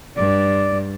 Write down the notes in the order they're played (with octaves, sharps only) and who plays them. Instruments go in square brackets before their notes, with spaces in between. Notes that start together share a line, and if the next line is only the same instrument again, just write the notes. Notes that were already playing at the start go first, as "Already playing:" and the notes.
[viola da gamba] G2 [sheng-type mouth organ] D5